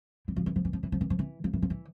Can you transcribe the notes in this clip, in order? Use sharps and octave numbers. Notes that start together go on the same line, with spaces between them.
E3
F3
E3
F3
E3
F3
E3
F3
E3
F3
E3
F3
E3
F3
E3